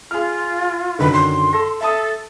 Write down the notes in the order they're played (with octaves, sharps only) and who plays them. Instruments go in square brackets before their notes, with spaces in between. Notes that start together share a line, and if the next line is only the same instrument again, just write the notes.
[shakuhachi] F4 [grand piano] G#4 F6
[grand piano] F#2 D3 D#3 [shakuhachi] B4
[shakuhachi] C6
[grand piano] A4 A#6
[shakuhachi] A4 [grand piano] E5 A5 D#6